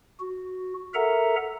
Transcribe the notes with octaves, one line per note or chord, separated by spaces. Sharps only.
F#4
A4 A#4 E5 F#5 A#5